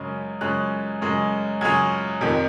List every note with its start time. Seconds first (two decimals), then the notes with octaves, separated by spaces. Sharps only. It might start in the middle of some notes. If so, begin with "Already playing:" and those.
Already playing: F#2 C#3 G#3 C#4 F6
0.41 F#2 C#3 G#3 C#4 F#6
1.01 F#2 C#3 G#3 C#4
1.61 F#2 C#3 G#3 C#4 G#6
2.21 F2 C3 D#3